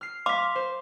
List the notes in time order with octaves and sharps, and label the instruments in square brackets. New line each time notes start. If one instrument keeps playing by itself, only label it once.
[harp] F6 C7
[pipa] F5 [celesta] C6 B6 [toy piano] D6
[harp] C5